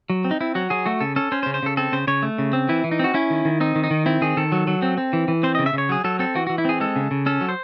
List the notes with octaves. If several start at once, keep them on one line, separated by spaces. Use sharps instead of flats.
F#3
C4
D#4
C4 E4
F#3 F#4
F#3 G#4
A3 F#4
C#3 A4
C#4 A4
C#4 C5
C5
C#3
C5
C#3 A4
C4 A4
C#3 C5
C#3 C#5
A3
C#3
C4
E3 E4
E3
D#4
C4 F#4
C#4 E4
D#3
D#3
C4 D#4
D#3
D#4
D#3
C4 E4
D#3 G#4
D#3 A4
F#3
F#3
C4
C4
E3
E3
C4 C5
C#3 D#5
E5
C#3 C#5
F#3 G#4
F#3 A4
C4 A4
E3 F#4
E3 F#4
E4
C4 G#4
G#3 A4
C#3
C#3
C#4 A4
F#3
C5